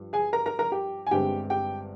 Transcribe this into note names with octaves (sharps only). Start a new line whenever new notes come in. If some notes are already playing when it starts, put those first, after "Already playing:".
Already playing: G2 F3
G#4 G#5
A#4 A#5
A#4 A#5
A#4 A#5
G4 G5
G#5
G1 G2 D3 G#3 C4 G4 G5
G4 G5